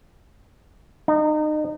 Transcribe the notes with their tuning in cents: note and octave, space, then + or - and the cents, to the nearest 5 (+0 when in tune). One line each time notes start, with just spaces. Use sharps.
D#4 -30